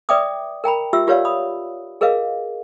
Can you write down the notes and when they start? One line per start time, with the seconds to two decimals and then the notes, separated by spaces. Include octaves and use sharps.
0.09 B4 D5 E5 G5 D6 D#6
0.64 A#4 G5 A#5 B5
0.93 F4 G4 E5 E6
1.07 F4 G4 B4 C#5 D5 F5
1.25 B5 D#6
2.01 G#4 A#4 B4 D#5 F5